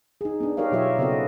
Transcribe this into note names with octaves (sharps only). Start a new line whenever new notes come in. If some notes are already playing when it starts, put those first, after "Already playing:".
D#4 G#4
B3 D4
D#4 G4 A#4 C#5 D#5 F5
B2 F#3 F4 G4 C#5 E5
C#3 B3 C4 F#4 A4 D#5